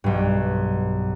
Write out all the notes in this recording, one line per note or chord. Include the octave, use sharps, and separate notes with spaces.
B1 G2